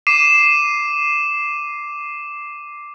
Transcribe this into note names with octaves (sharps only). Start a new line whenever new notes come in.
D6 C7 D#7 E7